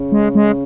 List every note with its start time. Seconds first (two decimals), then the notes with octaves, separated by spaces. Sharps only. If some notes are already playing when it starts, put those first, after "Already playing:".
Already playing: C#3
0.12 G#3
0.35 G#3